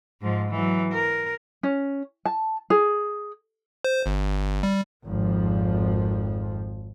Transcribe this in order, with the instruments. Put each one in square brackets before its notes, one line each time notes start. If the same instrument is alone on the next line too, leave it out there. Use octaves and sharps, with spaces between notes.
[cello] G#2 F3
E3 F#3
A#4
[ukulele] C#4
A5
G#4
[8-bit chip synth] C5
G1
G3
[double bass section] G#1 F2 F3